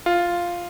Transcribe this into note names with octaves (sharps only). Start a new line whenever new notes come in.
F4